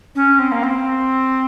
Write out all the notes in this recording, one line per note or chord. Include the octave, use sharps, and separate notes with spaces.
C#4
C4
A#3
C4